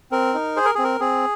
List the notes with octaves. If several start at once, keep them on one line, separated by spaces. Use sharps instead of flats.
C4 A#4
D#4
G#4 C5
A#4
C4 G#4
A#4
C4 G#4